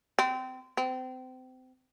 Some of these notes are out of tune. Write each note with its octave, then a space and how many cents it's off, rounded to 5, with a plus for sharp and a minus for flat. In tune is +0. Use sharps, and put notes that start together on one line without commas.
C4 -25
C4 -30